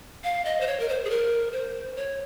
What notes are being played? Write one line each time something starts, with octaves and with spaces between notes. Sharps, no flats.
F5
D#5
C5
C#5
A#4
C5
G#4
A#4
C5
C#5